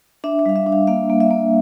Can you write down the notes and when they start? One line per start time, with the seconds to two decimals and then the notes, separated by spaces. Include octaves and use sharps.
0.24 D4 E5
0.39 E5
0.46 G3 F5
0.56 E5
0.67 D4
0.72 F5
0.87 A#3 F5
1.10 A#3
1.20 E5
1.30 A#3